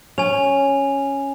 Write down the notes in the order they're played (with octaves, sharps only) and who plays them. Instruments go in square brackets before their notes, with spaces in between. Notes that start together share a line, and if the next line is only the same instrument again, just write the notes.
[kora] C#4 [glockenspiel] G#5 F7